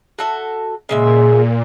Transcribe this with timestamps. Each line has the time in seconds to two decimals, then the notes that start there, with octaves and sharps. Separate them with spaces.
0.19 F#4 A4 E5
0.89 A#2 C#3 G#3 E5